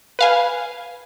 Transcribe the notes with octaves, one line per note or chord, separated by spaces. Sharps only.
B4 F5 G#5